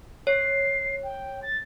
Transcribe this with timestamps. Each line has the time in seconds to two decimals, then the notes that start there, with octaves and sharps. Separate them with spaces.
0.27 C#5 C7
1.03 G5
1.43 A6